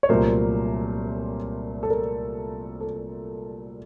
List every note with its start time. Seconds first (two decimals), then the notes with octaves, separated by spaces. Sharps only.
0.03 C#5
0.09 C2 A#2 F#3 A3 A#4 C5
1.83 A4
1.90 A#4
2.81 A4